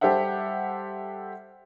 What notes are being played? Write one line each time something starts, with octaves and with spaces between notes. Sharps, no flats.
G3 G4 A4 C5 E5 F#5